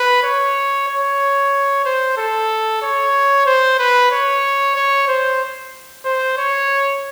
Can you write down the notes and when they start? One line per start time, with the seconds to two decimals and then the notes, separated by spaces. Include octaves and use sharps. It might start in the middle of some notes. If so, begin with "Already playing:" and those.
Already playing: B4
0.23 C#5
0.88 C#5
1.85 C5
2.17 A4
2.82 C#5
3.46 C5
3.79 B4
4.11 C#5
4.76 C#5
5.08 C5
6.05 C5
6.37 C#5